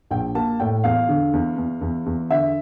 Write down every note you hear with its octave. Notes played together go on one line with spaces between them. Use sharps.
A#1 G5
A#3 A5
A2 G5
E2 F5
D3
E2
E2
E2
E2
D3 E5